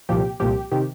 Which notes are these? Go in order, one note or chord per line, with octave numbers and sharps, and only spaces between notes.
C2 A#2 F3 G4
C2 A#2 F3 G4
C3 D#3 G4